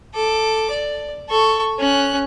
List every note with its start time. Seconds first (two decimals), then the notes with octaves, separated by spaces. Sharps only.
0.14 A4 D6
0.71 D5
1.29 A4 C#6
1.79 C#4 F#6